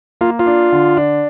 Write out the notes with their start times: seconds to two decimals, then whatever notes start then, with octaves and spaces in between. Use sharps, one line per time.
0.21 A#3 F4
0.39 F4
0.46 D4
0.72 D3
0.97 D4